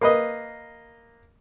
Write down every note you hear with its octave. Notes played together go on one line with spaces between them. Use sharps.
A#3 B4 D#5